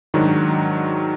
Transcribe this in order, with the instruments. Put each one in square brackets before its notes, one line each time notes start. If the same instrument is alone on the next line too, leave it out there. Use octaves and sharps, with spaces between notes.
[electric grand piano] G#2 D#3 F#3 D4 F#4